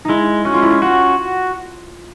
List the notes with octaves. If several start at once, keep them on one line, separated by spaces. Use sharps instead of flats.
G#3 D#4 E4
C#4 F#4
F4
E4
F4
F4 F#4